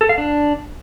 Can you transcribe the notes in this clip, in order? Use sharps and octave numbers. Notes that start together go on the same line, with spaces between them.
A4
F5
D4